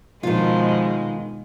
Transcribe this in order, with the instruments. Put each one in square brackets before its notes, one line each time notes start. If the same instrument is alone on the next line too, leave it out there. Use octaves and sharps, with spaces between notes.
[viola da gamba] B2 G#3 [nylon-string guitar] D#3 F4 [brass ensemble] F3